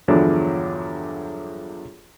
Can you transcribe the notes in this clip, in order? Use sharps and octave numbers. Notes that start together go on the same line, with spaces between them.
E2 G2 D3 F3 F#3 D4